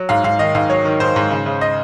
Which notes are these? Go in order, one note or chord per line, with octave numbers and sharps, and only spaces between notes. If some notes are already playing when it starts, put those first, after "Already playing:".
Already playing: F#3
G#2 F5
G#2 F5
D#3 D#5
G#2 F5
F#3 C#5
D#3
G#2 C5
G#2
C#3
C#3
D#5